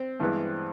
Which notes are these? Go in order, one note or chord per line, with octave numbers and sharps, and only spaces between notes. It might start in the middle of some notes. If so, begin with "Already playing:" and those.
Already playing: C4
G2 E3 G#3 B3